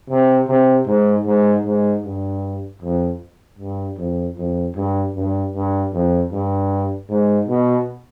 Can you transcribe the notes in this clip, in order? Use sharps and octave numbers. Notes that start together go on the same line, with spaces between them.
C3
C3
G#2
G#2
G#2
G2
F2
G2
F2
F2
G2
G2
G2
F2
G2
G#2
B2